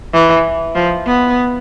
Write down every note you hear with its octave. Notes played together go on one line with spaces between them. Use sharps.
E3
F3
B3